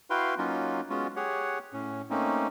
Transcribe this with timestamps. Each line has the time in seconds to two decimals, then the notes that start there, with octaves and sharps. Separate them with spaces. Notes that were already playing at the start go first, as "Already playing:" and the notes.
0.10 E4 F#4 B4 F5 G5 C6
0.38 F#3 A#3 C#4 D#4 F4 F#4
0.90 G#3 B3 C#4 F4 F#4
1.16 G4 G#4 C#5 F#5
1.73 A2 C#4
2.10 A3 A#3 C4 C#4 D#4